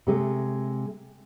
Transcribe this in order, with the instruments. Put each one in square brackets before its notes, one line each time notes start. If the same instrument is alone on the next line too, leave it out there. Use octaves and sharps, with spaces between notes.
[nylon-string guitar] C3 G#3 A3